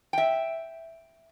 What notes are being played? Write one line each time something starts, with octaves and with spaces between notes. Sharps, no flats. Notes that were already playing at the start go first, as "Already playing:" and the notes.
E5 G5